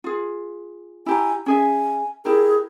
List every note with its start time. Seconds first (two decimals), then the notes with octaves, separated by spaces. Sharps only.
0.04 F4 G#4
1.06 E4 G4 G#5 A#5
1.46 C#4 G#4 E5 G#5
2.25 E4 G4 G#4 A#4